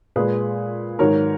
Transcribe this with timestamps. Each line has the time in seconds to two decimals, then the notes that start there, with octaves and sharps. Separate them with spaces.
0.16 A#2 G#3 G#4 B4
0.99 G#2 D#3 F#3 A#4 C#5